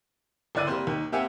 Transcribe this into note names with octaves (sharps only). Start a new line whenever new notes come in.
G1 C#2 E4 D5 F#6 D#7
G3 A#3 C4 C5
D#2 D#3
A#3 C4 G4 E5 F#5 G#5